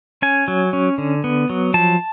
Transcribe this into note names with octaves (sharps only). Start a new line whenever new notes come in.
C#4 G#5
F#3
C#4
D3
B3
F#3
F3 A5